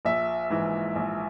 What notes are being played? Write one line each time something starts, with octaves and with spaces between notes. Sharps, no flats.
A#1 E5
G#2 E3
A#1